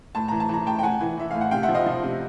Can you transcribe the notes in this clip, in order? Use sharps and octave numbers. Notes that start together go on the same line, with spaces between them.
A2 A5
E3 A#5
A5
E3 A#5
A2 G5 A5
G5
A2 F#5 G#5
E3
E3 E5
A2 F5
F#5
C3 F5 G5
E5 F#5
F3
D#5 F5
F3
C3